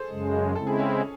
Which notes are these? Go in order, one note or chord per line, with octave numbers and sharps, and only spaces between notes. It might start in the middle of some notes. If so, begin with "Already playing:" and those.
Already playing: G#4 A4 C5
F#2 C#3 G#3
C#3 G#3 C4 E4 A4
G#4
C#4